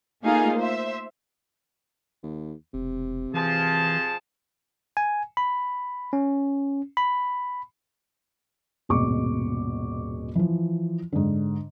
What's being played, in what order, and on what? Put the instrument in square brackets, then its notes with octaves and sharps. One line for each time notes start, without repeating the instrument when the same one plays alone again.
[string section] A3 A#3 D#4 F4 G#4 F5
C5 E5
[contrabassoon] D#2
[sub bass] E1 [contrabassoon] C3
[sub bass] E3 [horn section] F3 G#4 A5
[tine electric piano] G#5
B5
C#4
B5
[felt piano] D#1 G#1 B2 G#3 C#6 D6
E3 F3
G#2 D3